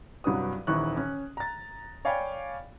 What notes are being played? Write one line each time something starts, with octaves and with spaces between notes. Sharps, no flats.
C2 G2 F#3 B4 D#6
D#1 D#2 E3 E4 C#6 F#6
C#4
A#5 A6
C#5 D5 F5 G5 G#5 B5